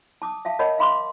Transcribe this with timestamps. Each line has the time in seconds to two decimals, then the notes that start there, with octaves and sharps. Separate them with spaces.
0.22 A5 D6 D#6
0.45 E5 F5 A5
0.59 A#4 C#5 D#5 F#5 A5 B5
0.78 E5 F5 B5 C6 D6